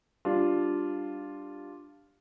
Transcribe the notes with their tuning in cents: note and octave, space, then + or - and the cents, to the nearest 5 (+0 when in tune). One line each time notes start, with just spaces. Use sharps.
G3 +0 D4 +0 F4 +0